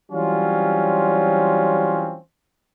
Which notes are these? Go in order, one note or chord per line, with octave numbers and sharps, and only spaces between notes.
E3 F#3 G3 C4 C#4 F4